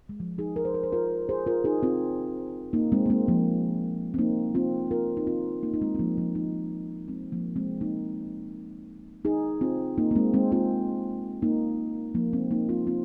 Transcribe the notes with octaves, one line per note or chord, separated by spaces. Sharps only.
G#3
F3
D#4 G#4
A#4
C5
A#4
C5
F4 A#4
G#4 C5
F4 A#4
D#4 G#4
C4 F4
A#3 D#4
G#3 C4
A#3
G#3 C4
F3 A#3
C4
A#3 D#4
C4 F4
F4 A#4
D#4
C4 F4
A#3 D#4
D#4
G#3 C4
C4
F3 A#3
F3 A#3
A#3 D#4
G#3 C4
F3 A#3
G#3 C4
A#3 D#4
D#4 G#4
C4 F4
A#3 D#4
A#3
G#3 C4
G#3 C4
C4 F4
A#3 D#4
F3 A#3
G#3 C4
A#3 D#4
C4 F4
C4 F4